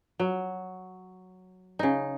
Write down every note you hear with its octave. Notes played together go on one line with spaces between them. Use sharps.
F#3
C#3 D#4